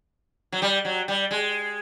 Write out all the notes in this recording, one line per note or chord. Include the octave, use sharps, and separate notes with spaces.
F#3
G3
F#3
G3
G#3